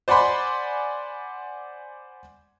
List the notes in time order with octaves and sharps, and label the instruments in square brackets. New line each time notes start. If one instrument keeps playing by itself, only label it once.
[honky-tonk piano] C5 D5 F#5 G#5 B5 C6